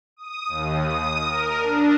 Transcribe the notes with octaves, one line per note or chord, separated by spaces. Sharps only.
D#6
D#2
D#6
A#4
D4